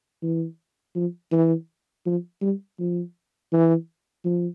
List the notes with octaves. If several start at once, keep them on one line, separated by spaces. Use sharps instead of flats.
E3
F3
E3
F3
G3
F3
E3
F3